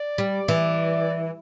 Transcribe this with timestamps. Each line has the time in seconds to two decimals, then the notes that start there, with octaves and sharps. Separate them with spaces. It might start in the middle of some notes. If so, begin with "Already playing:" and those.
Already playing: D5
0.18 G3
0.48 E3